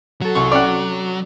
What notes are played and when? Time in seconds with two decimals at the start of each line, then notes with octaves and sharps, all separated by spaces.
0.21 F#3 F#4 A4
0.35 C2 C#6 C#7
0.52 C#4 D5 F#5